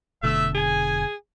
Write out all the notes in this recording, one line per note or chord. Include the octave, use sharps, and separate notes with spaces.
F1 B2 D3 A3 E5
G#4 G#5